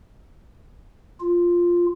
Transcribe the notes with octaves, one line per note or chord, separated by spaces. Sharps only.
F4